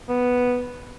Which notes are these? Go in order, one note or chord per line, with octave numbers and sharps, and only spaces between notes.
B3